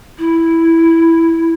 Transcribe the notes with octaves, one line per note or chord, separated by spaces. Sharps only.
E4